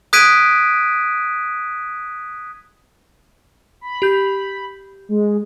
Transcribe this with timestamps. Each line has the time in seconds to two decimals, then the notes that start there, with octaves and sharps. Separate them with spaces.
0.13 D#6 F#6 G#6 B6 D7 D#7
3.81 B5
4.02 G4 G6
5.09 G#3